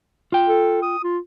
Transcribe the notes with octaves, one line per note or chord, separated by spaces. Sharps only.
F4 G5
A4
D#6
F4